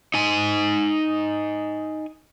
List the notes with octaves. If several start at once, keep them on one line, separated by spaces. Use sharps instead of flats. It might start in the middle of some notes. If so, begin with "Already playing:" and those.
D#4 G#5